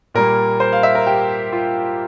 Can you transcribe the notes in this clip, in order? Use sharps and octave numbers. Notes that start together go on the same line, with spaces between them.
A#2 G3 A#3 A#4
C5
F5
E5
A#4
G4
F4